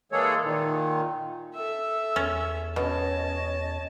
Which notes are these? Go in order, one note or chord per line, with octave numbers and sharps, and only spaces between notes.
E3 G#3 A#3 G#4 A4 C#5
A#2 D#3
A4 E5 E6
E2 C#4
B2 C#4 C#5 D#5 A5